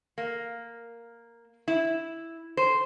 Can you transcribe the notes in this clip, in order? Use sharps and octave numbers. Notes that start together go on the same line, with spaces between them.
A#3
E4
C5